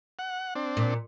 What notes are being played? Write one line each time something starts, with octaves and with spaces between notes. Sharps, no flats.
F#5
C4 D4
A#2